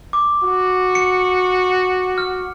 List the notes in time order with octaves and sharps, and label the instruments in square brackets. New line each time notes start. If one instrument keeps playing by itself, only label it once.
[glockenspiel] D6
[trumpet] F#4
[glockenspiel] C#7
F6